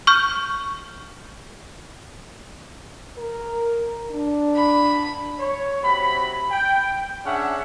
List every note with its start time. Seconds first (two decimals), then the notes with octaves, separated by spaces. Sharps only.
0.07 C#6 F6 G6
3.18 A#4
4.11 D4
4.56 B5
5.39 C#5
5.82 C3 F#3 B5
6.51 G5
7.25 C#4 D4 G#4 E5 F#5